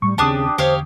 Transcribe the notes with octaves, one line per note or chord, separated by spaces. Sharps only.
A2 G3 C#6
D#2 C#3 C4 D4 G4 A5 D6 D#6
E2 D3 G4 C5 C#5 F5